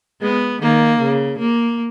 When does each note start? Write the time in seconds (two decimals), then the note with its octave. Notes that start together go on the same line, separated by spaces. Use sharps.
0.22 G#3 B3
0.62 D#3 A#3
1.00 C#3
1.39 A#3